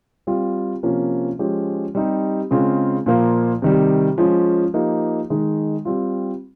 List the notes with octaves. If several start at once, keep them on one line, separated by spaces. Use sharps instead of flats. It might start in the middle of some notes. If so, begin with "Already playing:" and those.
G3 C4 F4
C3 F3 A#3 C#4 F4
F3 G#3 C#4 G4
G3 C4 D#4 G4
C#3 G#3 C4 F4
A#2 F3 A#3 F4
C3 D#3 G3
F3 G#3 C#4 F4
F3 A#3 D#4 G4
D#3 G#3 D#4
G3 C4 F4